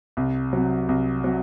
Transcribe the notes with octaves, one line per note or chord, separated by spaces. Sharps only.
C2
C3 F#3
C2
C3 F#3